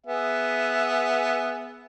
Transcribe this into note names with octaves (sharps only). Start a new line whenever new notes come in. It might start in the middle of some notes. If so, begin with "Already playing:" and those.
B3 G#4 E5